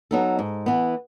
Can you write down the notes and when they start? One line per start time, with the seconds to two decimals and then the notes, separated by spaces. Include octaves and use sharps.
0.11 F#3 B3 D#4 A4
0.39 G#2
0.66 E3 B3